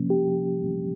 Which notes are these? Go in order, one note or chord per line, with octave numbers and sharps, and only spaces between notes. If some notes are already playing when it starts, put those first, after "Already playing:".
Already playing: C3 F3 A#3 C#4
G4